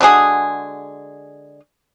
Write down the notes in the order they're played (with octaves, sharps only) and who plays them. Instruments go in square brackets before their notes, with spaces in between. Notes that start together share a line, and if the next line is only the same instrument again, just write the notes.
[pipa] D3 G#3 F#4 G#4